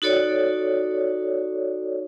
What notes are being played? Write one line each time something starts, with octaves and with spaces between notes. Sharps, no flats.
D#4 F#4 A4 C#5 D5